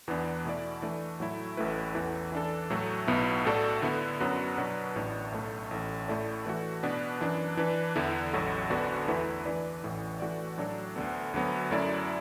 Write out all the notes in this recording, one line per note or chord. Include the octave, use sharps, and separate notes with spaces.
E2 E3 B3 D4
B2 A3 E4 D5
E3 A3 D4
A2 F#3 A3 E4
A1 A2 A3 E4 B4
E2 E3 A3
E3 D4 A4
A2 F#3 A3
B1 B2 B3 E4
A2 A3 F#4 A4 D5
D3 B3 E4
F#2 F#3 B3 D4 F#4
B2 F#3 B3 D4 B4
A1 A2 A3 D4
B1 A2 A3
A1 A2 A3
A2 A3 E4 A4 D5
E3 A3 F#4
B2 B3 D4 B4
F#2 E3 D4
E3 D4 B4
E2 D3 B3 E4
A1 A2 F#3 A3 F#4
D2 D3 B3 D4 F#4
E2 E3 A3 E4 B4
E3 D4 B4 D5
A1 A2 E3
E3 A3 F#4 D5
A2 F#3 D4 A4
D2 D3 B3
D2 D3 F#3 B3
F#2 F#3 A3 E4 D5